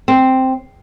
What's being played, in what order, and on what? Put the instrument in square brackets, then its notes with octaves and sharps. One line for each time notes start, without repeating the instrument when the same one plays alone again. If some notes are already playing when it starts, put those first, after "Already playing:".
[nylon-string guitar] C4